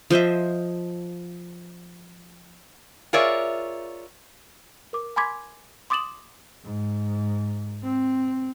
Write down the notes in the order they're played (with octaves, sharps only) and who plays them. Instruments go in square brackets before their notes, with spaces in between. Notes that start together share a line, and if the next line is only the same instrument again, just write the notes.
[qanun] F3 C5 D#5 E5
[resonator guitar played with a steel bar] F4 G#4 A#4 C#5 D5 E5
[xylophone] A#4 D6
G#5 B5 C6 D6 G#6 B6
C6 D6 D#6 A6 E7 F#7
[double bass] G#2
C4